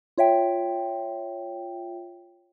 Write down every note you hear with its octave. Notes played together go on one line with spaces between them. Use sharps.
F4 C#5 E5 G5